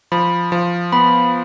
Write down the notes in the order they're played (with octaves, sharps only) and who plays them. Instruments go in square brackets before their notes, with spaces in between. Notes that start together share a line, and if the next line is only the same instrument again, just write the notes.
[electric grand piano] F3 [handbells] B5
[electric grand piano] F3
[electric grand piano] B3 [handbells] B5